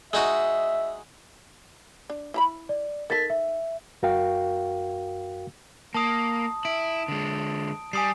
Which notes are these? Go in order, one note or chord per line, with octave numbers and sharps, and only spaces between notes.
G#3 D#4 F#4 E5
D4
E4 A#5 B5
D5
D#4 A4 A#4 A6 B6
E5
F#2 F#4 A#4 F5 G5
A#3 A5 D#6
E4 D7
D3 G#3
G3 G#5 D#6 C7